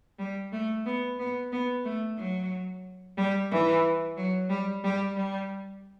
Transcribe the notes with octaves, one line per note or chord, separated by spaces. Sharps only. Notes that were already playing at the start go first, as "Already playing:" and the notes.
G3
A3
B3
B3
B3
A3
F#3
G3
E3
F#3
G3
G3
G3